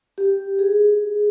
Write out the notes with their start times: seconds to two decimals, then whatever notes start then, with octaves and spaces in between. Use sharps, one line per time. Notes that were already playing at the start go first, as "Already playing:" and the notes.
0.18 G4
0.59 G#4